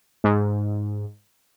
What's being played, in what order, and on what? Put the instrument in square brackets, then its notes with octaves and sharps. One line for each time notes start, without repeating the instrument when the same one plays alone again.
[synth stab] G#2